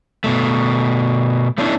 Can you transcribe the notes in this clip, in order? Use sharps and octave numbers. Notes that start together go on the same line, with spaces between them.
B2 A3
A3 B3 C#4 D4 E4